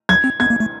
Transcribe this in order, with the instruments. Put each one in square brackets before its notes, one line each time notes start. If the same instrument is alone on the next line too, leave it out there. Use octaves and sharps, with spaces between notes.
[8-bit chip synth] F#3 [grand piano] G#6
[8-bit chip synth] C4
[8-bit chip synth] B3 [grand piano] G#6
[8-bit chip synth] A#3
A3